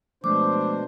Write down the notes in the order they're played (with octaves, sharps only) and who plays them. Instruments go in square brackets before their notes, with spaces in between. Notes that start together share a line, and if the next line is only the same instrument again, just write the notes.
[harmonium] B2 D4 C5 [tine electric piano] F3 G#3 A3 [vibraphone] D6